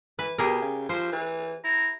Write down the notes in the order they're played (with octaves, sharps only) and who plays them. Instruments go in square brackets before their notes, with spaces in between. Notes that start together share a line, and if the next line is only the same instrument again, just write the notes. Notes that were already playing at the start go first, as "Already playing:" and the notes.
[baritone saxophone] E3 [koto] B4
[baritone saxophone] B2 [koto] G4 G#4 A#4
[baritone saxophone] C#3
[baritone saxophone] F3 [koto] C5
[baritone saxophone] E3
[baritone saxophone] E4 [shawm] A#5